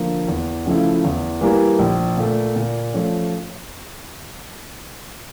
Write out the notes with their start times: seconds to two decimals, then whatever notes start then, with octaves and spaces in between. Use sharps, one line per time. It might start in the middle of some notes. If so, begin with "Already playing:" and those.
Already playing: D3 F3 A#3
0.28 E2
0.66 C#3 F3 A3 E4
1.04 E2
1.41 E3 G3 A#3
1.79 A#1
2.17 A#2 A3
2.56 A#2
2.93 F3 A3 C#4